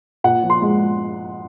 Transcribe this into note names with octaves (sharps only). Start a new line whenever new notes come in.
A#2 F#5
F3
C6
G#3